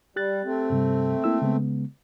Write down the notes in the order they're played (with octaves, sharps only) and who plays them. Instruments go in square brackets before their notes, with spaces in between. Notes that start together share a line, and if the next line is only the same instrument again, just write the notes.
[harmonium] G3 [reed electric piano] G4 F#6 A6
[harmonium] A3 C4
[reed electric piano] G2 C3 G3
A#3 E4 E6
C#3 G#3 B3